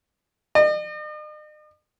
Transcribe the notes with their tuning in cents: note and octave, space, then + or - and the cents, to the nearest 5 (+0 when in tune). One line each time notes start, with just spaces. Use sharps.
D#5 -45